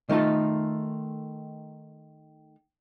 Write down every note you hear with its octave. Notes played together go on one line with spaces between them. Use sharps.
D#3 A3 D#4 F4 A4